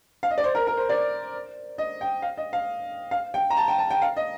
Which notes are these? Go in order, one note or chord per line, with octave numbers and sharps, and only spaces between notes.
F5
D#5
D5
C5
A#4
A#4
C5
D5
D#5
G5
F5
D#5
F5
F5
G5
A#5
A5
G5
A5
G5
F5
D#5